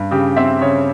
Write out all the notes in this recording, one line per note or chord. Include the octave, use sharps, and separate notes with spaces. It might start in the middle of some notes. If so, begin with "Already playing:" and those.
Already playing: G2
C#3 G4
C4 E5
C#3 C#5